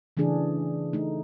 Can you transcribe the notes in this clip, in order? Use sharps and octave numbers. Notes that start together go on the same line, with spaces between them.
C#3 E3 A3 D4 G#4
A3 D#4